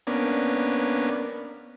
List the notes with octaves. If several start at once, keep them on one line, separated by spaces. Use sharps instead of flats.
A#3 B3 C#4 D4